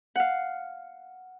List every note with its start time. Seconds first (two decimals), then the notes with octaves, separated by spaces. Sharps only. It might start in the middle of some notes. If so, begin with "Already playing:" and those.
0.16 F5 F#5